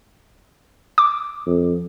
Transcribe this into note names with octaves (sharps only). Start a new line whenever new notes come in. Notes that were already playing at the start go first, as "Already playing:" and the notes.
D6
F2